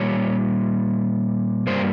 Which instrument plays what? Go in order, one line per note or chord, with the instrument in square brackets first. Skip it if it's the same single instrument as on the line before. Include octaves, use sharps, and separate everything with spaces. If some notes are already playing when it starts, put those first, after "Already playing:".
Already playing: [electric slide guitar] A#2 G3 C#5
G2 G3 A#3 C5